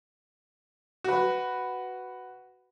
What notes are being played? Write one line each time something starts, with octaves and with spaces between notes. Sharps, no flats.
F#4 B4